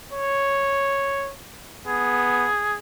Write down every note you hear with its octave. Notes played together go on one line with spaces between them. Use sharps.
C#5
B3 G#4